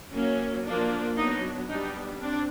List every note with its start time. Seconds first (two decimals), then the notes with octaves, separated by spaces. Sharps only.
0.14 F#3 A#3 C#4
0.66 F3 A#3 D4
1.17 F#3 B3 D4 D#4
1.68 G3 B3 D4 D#4
2.20 C4 D4